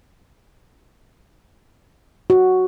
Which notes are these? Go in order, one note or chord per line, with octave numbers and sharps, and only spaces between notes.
F#4